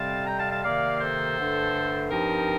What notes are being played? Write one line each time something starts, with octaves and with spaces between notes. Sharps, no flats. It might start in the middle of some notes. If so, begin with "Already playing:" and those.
Already playing: F2 C3 G3 C4 F5 A5
G5 A#5
F5 A5
F5 A5
C3 D#3 A#3 D5 F5
A4 C5
G2 D3 A3
G2 F3 C4 D#4 G4 A#4